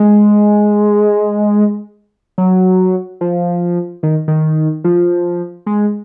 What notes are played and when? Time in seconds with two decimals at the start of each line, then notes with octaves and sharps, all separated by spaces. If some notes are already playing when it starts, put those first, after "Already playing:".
Already playing: G#3
2.38 F#3
3.21 F3
4.03 D#3
4.28 D#3
4.84 F3
5.66 G#3